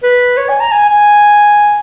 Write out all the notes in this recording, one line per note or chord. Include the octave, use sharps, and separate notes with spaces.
B4
C#5
G#5
A#5
G#5
G#5